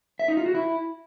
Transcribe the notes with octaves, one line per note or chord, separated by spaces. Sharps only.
E5
D#4
F4
F#4
E4